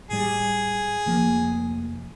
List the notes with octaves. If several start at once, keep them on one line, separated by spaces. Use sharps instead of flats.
A2 G3 G#4
F1 F3 A#3